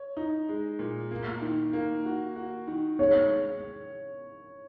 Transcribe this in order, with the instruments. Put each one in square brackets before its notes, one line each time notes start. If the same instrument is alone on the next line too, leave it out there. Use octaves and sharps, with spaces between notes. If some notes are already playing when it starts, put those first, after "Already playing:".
Already playing: [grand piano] C#5
D#4
G#3
A#2
A#3
D#3
A#3
F#4
F#4
D#3
[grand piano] G#3 [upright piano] C#5